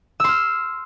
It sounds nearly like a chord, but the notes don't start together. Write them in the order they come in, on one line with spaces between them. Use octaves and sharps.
E6 C6 F6